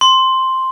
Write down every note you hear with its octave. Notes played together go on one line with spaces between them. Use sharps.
C6